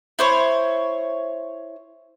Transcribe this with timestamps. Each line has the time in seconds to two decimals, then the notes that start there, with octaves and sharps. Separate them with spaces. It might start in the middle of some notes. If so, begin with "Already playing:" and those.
0.19 E4 C5 C#5